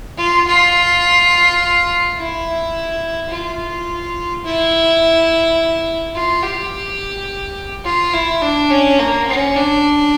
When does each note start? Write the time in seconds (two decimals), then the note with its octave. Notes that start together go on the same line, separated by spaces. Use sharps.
0.18 F4
0.47 F4
2.17 E4
3.31 F4
4.45 E4
6.15 F4
6.43 G4
7.85 F4
8.13 E4
8.42 D4
8.70 C#4
8.99 A#3
9.27 C#4
9.55 D4